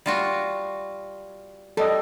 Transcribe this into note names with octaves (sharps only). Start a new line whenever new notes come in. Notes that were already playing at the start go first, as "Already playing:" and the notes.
G3 F4 F#4
G3 A4 D#5